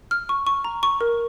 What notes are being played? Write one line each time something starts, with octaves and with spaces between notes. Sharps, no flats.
F6
C#6
C#6
A#5
C#6
A#4